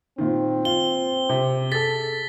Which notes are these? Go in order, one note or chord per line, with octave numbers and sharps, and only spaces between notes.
A#2 D#3 C4
F4 G7
C3
G#4 A4 A6 B6